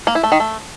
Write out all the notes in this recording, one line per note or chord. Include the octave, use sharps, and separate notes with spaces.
A#3
E4
A3
D#3
A3